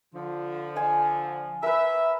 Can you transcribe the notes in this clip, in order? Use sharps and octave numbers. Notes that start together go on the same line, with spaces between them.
D3 F3
F5 G#5
A#4 B4 E5